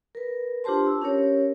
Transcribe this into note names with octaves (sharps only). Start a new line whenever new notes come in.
A#4 B4
D4 F4 G4 C5 A5 C6
E6
C#4 G4 A#4 C#5